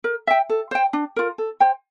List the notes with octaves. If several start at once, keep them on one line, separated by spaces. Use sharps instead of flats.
A#4
E5 G5
A4
C5 G5
D4
F4 A#4
A4
C5 G5